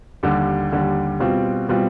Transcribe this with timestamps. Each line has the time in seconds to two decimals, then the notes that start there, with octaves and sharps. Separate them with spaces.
0.23 D#2 D3 G3
0.72 D#2 D3 G3
1.20 B2 G3 C4 F4
1.69 B2 G3 C4 F4